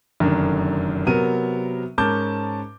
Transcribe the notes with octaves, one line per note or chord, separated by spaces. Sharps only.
F1 F#2 D3 D#3
C3 F#3 B3 A#4 D#7
G#2 C#4 A#4 A5 D6 G6